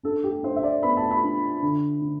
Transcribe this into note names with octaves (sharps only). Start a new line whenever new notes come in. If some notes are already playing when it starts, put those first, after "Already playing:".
D4 A4
G4
D4 C5
E5
D5
B3 B5
A5
B5
D4
D3
D3